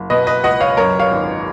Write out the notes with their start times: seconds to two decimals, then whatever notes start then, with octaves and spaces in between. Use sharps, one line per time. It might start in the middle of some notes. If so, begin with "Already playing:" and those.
Already playing: F#1
0.10 B2 B4 D#5
0.27 B4 D#5
0.44 C#2 D#5 F#5
0.61 C#5 F5
0.77 F#2 A#4 C#5
0.99 C#5 F5
1.11 G#1